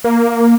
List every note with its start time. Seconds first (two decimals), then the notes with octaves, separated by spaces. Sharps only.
0.04 A#3